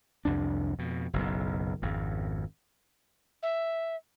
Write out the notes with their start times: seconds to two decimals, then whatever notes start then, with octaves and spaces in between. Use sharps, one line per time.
0.25 C2 F2 D4
0.79 F2 B2
1.13 F#1 B1 F#2
1.82 G#1 F2
3.42 E5